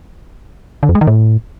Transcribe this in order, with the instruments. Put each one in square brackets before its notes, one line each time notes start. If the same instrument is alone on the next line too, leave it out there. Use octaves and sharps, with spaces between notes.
[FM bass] D3
F2
G#3
D#3
A2